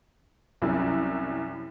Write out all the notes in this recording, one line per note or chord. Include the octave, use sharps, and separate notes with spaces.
C2 F#2 E4